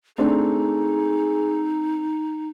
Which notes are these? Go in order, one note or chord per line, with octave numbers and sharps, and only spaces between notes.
A3 C4 D4 D#4 G#4